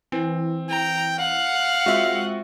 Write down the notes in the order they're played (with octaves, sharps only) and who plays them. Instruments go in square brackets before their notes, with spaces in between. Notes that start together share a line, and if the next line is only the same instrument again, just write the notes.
[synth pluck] E3 [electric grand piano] C4
[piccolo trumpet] G5 [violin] A#5
[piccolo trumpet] F5 [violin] F#5
[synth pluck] G#3 E5 [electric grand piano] C4 F4 F#4